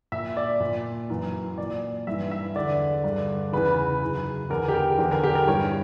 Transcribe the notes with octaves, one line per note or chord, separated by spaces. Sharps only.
A#2 E5
D5
A#2
F#2 E3
A#2 D5
G2 E3 E5
E5
E2 D3 D5
G2 D3
E2 C#3 E3 B4
F#2 C#3 E3
E2 D3 A#4
G4
A#4
E2 D3
A#4
G4
A#4
G2 E3 C#5